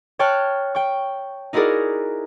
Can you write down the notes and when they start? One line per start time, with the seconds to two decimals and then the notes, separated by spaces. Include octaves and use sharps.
0.19 C#5 G5 A5 C#6 F6 F#6
0.75 G5 C#6
1.53 D#4 E4 F#4 G#4 A#4 D5